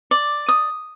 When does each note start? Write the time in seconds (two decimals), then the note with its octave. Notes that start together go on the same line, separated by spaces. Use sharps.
0.11 D5
0.48 D#6